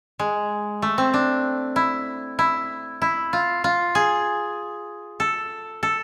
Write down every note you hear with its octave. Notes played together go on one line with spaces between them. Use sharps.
G#3
A3
C4
D4
E4
E4
E4
F4
F4
G#4
A4
A4